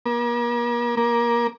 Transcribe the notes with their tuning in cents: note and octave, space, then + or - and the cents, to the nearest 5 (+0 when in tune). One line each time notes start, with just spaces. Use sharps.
A#3 +40
A#3 +20